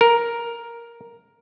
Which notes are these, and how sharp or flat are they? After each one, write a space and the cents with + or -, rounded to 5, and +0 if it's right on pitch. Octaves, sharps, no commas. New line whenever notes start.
A#4 +5